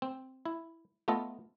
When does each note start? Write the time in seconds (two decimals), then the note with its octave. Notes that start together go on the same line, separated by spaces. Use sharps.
0.02 C4
0.46 E4
1.08 A3 B3 F4 A4 D#5